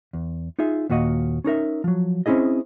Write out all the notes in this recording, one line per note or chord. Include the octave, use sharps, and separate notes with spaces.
E2
D#4 F4 G#4 E5
D#2 A#2 F#4 D#5 F5
C#4 D#4 A#4 E5
F3 F#3
C4 C#4 E4 G#4 D#5